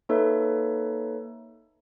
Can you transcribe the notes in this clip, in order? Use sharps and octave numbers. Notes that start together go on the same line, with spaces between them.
A#3 D#4 A4 B4 C#5 E5